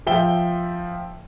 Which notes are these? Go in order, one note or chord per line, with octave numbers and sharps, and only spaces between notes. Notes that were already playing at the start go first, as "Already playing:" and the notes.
F3 E5 G5 G7